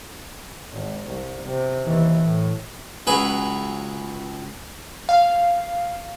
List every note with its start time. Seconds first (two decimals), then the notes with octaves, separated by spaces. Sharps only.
0.72 G#1
1.06 C2
1.44 C3
1.84 D#2 E3
2.24 A2
3.07 C#2 F#3 G#4 B4
5.09 F5